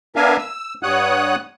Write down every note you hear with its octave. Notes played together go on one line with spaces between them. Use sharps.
B3 D4 A#4 E5 F5 G#5
E6
G2 G3 C#5 F#5 D#6 F#6